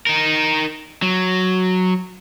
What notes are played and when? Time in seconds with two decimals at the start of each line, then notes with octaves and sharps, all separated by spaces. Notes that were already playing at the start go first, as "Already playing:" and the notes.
0.07 D#4 A#4
1.03 F#3